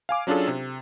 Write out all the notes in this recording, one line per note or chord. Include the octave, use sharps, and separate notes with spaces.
F5 G#5 D6
F#3 C#4 D4 F4 G#4 A4
C3